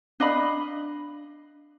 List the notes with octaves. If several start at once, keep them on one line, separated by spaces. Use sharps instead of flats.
D4 D#5 F5 B5